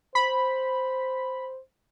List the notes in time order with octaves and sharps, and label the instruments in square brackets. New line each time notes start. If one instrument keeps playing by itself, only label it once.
[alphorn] C5 [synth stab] B5